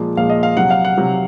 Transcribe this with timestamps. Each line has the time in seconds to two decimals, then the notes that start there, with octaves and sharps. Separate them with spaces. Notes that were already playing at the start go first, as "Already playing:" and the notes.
Already playing: A#2 F3 G#3
0.17 A#2 F3 G#3 F5
0.30 D#5
0.43 F5
0.57 C3 F#3 F#5
0.70 F5
0.85 F#5
0.97 C3 F#3